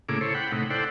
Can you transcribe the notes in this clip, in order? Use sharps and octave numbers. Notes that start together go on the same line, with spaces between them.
A2 C#3 A#3 E4 G#4 D6
E4 A4 C5 C#5
F#5 G5 B5
A2 C3 D#4
E4 A4 C5 D5 F#5 G5